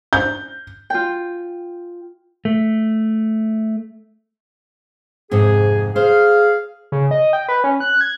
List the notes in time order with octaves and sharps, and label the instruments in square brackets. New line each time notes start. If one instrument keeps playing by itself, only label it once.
[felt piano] G6
[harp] F4 G5
[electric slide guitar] A3
[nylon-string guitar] F2 G#2 C3 [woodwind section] G#4
[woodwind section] G#4 F5 [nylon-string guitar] C5
[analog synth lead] C#3
D#5
G5
B4
C#4
F#6
G#6